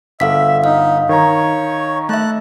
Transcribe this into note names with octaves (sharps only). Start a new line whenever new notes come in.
G1 A4 E5 F5 B6
D#4 F5
D#3 C#5 A#5
A3 E5 A5 F#6